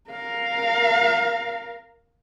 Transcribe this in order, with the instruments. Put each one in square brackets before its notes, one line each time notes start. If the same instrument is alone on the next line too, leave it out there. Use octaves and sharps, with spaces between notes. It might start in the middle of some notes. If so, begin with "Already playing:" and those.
[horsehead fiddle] A#4 F5